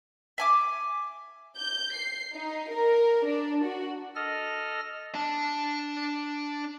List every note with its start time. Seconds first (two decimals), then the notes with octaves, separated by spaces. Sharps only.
0.38 E5 G#5 D6
1.56 G6
1.93 C7
2.34 D#4
2.70 A#4
3.26 D4
3.65 F#4
4.16 A4 D#5 F6 A#6
5.15 D4 A5